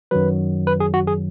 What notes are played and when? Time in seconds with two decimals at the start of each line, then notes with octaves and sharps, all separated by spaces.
0.11 F#2 D#3 F#3 B4
0.67 B4
0.80 G#4
0.94 F#4
1.07 G#4